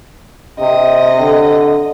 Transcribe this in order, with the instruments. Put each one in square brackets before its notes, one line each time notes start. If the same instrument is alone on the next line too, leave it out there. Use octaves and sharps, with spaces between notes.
[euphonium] C3 [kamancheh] D#5
[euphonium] D3